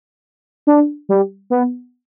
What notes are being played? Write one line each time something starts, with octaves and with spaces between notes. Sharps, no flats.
D4
G3
B3